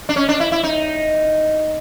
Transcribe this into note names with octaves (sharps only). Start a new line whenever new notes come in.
D4
C#4
D4
E4
E4
D#4